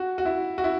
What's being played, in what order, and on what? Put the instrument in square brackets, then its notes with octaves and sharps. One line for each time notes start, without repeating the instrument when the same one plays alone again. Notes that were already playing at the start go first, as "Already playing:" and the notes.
Already playing: [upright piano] F#4
F#4
E4
F#4
E4